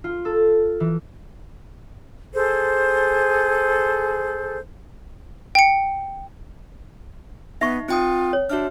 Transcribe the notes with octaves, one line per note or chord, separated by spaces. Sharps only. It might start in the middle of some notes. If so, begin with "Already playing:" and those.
F4
A4
E3
G#4 A4 C5
G5 C#7
B3 D#4 E5 C#6
C4 F4 G5 D#6
C#5
D4 F#4 E5 F6